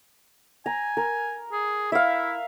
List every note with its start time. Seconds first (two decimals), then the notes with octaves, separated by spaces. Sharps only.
0.66 G#5 A#5
0.97 A#4
1.52 G#4
1.92 E4 E5 F5